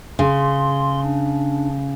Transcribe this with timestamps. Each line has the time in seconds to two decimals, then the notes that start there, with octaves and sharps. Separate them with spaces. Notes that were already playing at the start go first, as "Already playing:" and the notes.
0.19 C#3 C6
1.03 D4